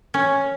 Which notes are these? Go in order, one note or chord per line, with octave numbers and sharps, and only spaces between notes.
C#4